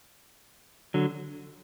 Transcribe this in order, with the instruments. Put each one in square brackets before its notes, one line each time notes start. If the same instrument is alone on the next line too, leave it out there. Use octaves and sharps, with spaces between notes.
[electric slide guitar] D3 F#3